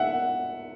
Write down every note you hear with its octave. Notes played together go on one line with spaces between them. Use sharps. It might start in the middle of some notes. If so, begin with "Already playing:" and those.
Already playing: E5 F#5